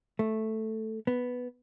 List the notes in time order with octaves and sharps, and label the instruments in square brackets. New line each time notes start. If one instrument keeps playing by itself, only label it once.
[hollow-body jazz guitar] A3
B3